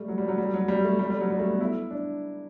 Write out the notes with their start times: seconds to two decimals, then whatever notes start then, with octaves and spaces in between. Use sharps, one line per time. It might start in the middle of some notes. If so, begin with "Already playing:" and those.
Already playing: G3 A3
0.08 F#3
0.18 G3
0.28 F#3
0.38 G3
0.54 F#3
0.68 G3
0.85 A3
0.99 G3
1.10 G3
1.20 F#3
1.30 G3
1.39 A3
1.50 B3
1.60 E4
1.91 D4